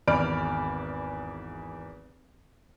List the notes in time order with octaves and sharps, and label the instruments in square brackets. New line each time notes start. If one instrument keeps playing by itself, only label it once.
[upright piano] G#1 E2 D5 B5 F6 D7